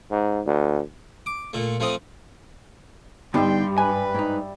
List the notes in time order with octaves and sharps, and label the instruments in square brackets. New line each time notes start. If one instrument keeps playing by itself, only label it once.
[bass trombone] G#2
D2
[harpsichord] D6
A#2 A3
F3 A3 C4 D#6
[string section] G2 [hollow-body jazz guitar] D3 B3 D#4 [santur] G3 E5 [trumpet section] G5 C6
[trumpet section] B4 [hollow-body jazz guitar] G#5
[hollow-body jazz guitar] G#2 D#4